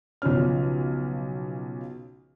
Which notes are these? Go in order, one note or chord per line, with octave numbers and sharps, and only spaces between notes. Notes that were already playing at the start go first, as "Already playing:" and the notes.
B1 C#3 F3 C#4 F6